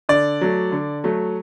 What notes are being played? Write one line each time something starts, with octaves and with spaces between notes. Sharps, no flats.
D3 D5
F#3 A3
D3
F#3 A3